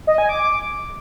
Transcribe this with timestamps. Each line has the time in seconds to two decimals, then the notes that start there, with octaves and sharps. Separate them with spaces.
0.07 D#5
0.18 G#5
0.29 D6